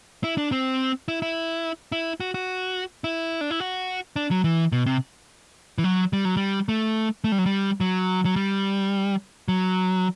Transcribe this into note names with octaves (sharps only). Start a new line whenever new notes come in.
E4
D4
C4
E4
E4
E4
F#4
F#4
E4
D4
E4
F#4
D4
F#3
E3
B2
C3
E3
F#3
G3
F#3
G3
A3
A3
G3
F#3
G3
F#3
F#3
G3
F#3